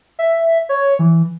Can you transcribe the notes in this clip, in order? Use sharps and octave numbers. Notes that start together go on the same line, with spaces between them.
E5
C#5
E3